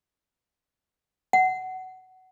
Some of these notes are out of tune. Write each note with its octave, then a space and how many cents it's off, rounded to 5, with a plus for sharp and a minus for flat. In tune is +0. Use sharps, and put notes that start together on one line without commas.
F#5 +15